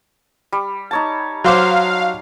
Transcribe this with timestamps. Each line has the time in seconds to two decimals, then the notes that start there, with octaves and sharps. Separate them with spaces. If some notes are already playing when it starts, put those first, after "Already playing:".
0.53 G3
0.91 D#4 C#5 A5
1.44 F#3 C5 F5 D6